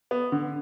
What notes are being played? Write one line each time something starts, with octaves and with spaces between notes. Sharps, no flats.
B3
D3